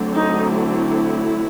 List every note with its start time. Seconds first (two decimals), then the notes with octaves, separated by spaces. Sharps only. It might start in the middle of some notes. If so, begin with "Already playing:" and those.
Already playing: D3 F#3 A3 C4
0.15 D#4
0.53 E4